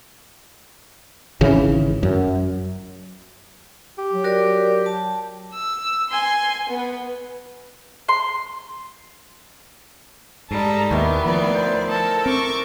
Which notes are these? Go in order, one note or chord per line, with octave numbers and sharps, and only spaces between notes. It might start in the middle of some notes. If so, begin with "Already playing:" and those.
G#1 C#3 E3
F#2
G4
F#3
F#4 A#4 D5
A5
E6
G#5 C6
B3 B4
C6
G#2 G3 A4 D#5 A#5
D#2 D#3 E3 B3
D2 F3 D5
C5
A4 A#4 A5
C4 C#6 D6